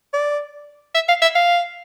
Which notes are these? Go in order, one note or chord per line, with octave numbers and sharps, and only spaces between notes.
D5
E5
F5
E5
F5